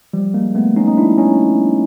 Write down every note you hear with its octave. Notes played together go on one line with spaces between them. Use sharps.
F3 G3
G#3 A#3
A3 B3
C#4 D#4
D#4
D4 E4
C#4 D#4